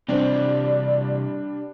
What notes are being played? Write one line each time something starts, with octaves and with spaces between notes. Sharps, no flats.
C3 E3 G3 C4 D4 G4 C5 D5